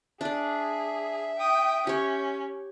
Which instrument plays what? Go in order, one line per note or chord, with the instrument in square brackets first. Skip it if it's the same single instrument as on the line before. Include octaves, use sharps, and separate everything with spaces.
[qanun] D4 D5 [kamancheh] G#4 [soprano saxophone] E5
[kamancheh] G5 D#6
[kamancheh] C#4 [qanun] G4 C#5